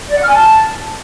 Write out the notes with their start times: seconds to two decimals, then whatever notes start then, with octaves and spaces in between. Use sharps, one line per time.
0.10 D5
0.16 F#5
0.22 F6
0.28 G#5
0.34 A5